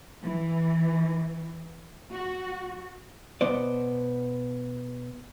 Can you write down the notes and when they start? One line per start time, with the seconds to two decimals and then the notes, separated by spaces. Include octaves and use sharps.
0.21 E3
2.11 F#4
3.41 B2 B3 C5 D5